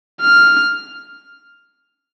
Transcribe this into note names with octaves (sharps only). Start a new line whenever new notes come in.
F6